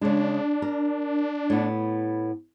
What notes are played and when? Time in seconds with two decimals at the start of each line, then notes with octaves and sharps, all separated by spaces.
0.01 C#3 G#3 D4
0.62 A#4
1.50 A2 B3